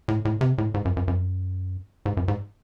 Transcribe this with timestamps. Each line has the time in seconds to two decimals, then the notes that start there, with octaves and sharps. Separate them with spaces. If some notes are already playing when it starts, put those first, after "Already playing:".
0.08 A2
0.25 A2
0.41 C3
0.58 A2
0.74 G#2
0.85 F#2
0.97 F#2
1.08 F#2
2.06 G#2
2.17 F#2
2.28 G#2